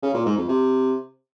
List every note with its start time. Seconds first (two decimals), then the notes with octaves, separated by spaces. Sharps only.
0.03 C#3
0.14 A#2
0.26 G#2
0.37 F2
0.49 C3